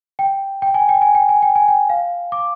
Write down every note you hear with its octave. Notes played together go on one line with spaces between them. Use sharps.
G5
G5
G#5
G5
G#5
G5
G#5
G5
G#5
G5
F5
D6